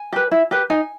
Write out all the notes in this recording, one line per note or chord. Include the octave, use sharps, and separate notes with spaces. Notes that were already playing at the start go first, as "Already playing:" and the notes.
Already playing: G#5
G4 B4
E4
G4 B4
D#4 G#5